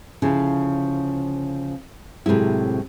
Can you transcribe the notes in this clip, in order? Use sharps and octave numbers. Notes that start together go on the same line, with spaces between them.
D2 C#3 F3 E4
A2 C3 F#3 G#3 E4